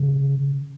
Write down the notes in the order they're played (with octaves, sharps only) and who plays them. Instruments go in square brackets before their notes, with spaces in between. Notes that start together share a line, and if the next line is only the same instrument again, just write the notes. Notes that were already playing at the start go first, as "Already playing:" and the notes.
Already playing: [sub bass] C#3